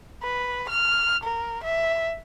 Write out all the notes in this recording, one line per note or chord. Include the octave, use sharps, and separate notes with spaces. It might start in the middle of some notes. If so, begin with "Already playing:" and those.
B4
F6
A#4
E5